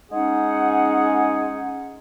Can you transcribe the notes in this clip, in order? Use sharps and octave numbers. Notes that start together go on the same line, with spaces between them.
G#3 C#4 D#4 G#4 F#5